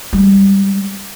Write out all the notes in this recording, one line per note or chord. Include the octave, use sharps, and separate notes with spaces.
G3 G#3